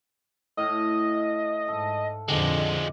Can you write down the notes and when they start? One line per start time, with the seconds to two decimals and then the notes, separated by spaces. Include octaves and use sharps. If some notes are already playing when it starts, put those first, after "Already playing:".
0.57 A2 D#5 F5
1.68 G#2 A4
2.28 F2 A#2 D3 F3 G#3 G4 D#5